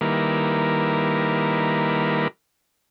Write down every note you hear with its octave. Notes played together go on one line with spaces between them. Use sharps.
D#3 G3 A#3 E4 A#4 B4